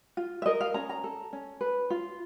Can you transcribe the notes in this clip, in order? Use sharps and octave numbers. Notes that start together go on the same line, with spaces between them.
F4
E5
A#4 D#5
F5
C#4 A#5
A#5
A4
C#4
B4
F4